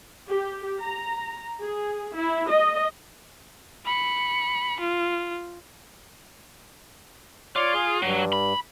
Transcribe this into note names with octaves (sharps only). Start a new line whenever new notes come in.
G4
A#5
G#4
E4
D#5
B5 C#7
F4
F4 C#5 D5 D6
G#4
G2 F#3
B5